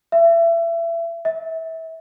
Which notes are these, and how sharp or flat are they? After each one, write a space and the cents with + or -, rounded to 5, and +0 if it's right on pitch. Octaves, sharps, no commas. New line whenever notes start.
E5 +30
E5 -25